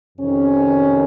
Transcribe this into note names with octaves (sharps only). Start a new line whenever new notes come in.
F2 C3 D#3 C#4